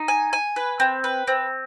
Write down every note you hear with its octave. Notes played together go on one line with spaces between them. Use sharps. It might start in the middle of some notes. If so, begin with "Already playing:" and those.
Already playing: D#4
G#5
G#5
B4
C4
B4
C4